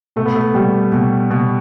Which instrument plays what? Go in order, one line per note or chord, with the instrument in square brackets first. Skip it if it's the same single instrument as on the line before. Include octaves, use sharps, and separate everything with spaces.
[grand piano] B2 A3
B3
A3
B2 G3
B2
B2